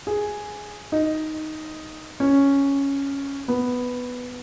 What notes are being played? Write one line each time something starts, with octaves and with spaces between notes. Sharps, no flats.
G#4
D#4
C#4
B3